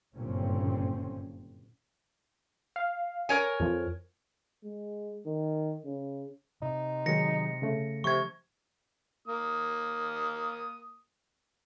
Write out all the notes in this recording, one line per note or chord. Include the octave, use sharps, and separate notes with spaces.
F#1 G2 A#2 D3 C4 C#4
F5
A#4 C#5 G#5
F2 F3
G#3
D#3
C#3
C3 D#4
D#3 F#3 G#3 A#6 C#7
C#3 A3
C3 F3 C#6 G#6
A#3 D#6